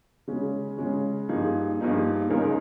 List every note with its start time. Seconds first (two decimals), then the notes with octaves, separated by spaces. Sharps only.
0.28 C#3 G#3 C#4
0.77 C#3 G#3 C#4
1.29 G2 F3 A#3 D#4 G#4
1.80 G2 F3 A#3 D#4 G#4
2.30 C#2 C#3 G#3 D#4 A#4